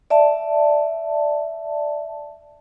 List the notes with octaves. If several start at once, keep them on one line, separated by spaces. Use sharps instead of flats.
D5 E5 A5